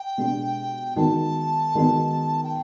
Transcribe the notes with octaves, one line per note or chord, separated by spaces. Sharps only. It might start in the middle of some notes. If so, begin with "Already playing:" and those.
Already playing: G5
B2 G#3 B3 D4 G4
D#3 G#3 B3 D#4 F#4 A5
D#3 G#3 B3 D#4 F#4
G5